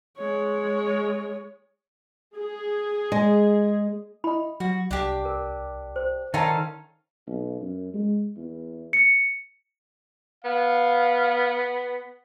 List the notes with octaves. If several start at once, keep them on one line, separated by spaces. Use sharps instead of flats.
G#3 C#5
G#4
G#3
E4 D#5 B5
F#3 F#4
C2 D4 G4
A#4
C5
D#3 C#4 D#4 F4 A4 D5 G5 A#5
B1
F#2
G#3
E2
C#7
B3 F5